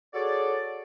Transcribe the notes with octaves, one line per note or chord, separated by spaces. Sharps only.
F#4 G#4 A4 C#5 D5